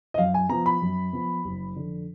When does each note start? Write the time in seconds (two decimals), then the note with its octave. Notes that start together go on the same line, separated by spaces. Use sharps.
0.14 D#5
0.18 F#2 F5
0.34 G#5
0.49 F3 B3 A#5
0.66 B5
0.82 F#2
1.13 F3 B3
1.45 F#1
1.76 F2 D3